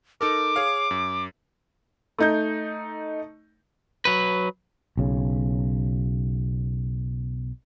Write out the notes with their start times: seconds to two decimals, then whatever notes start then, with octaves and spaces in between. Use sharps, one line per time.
0.21 D#4 A4 A#4 D6
0.56 G#4 C#5 F5
0.91 F#2
2.18 A3 D#4 G6
4.05 F#3 B4
4.97 B1 C#3